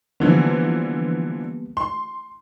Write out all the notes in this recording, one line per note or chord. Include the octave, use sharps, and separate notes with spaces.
D3 E3 F3 G3 A#3 B3
C6